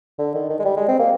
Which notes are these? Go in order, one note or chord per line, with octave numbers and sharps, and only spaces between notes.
D3
D#3
D#3
G#3
G3
G#3
C4
A#3